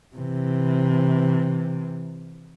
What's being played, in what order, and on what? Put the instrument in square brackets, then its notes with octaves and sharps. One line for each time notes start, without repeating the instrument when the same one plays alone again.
[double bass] C3 E3